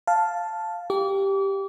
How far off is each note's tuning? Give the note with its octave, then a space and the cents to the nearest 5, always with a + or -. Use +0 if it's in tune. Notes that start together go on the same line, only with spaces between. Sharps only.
F5 +0 A5 +0
G4 +0 D6 -35